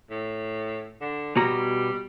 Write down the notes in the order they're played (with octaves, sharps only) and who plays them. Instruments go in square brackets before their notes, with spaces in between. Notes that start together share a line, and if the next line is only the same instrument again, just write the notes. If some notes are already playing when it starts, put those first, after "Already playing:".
[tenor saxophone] A2
D3
[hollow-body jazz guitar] B2 F#4 A#5 [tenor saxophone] G3